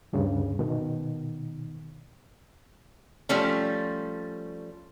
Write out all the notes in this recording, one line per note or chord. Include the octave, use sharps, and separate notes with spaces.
D2 G2 C#3
B2 D#3
F3 G3 A3 C#4